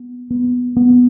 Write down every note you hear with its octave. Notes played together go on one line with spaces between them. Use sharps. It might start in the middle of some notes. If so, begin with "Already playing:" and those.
Already playing: B3
B3
B3